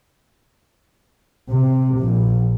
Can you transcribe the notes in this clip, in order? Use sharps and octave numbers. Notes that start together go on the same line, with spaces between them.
C3
A#1